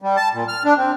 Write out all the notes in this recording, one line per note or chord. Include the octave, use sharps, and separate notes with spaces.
G3
A5
A#2
F6
D4
C4